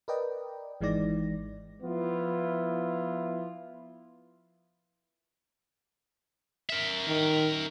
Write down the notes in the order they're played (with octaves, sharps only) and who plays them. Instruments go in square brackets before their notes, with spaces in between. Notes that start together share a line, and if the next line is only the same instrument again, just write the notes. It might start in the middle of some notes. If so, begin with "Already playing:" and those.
[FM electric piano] A#4 B4 D5 D#5 G5
G#1 E3 G#3 D#4 D5 A#6
[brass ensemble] F3 B3 E4 F4
[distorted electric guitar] A#4 E5
[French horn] D#3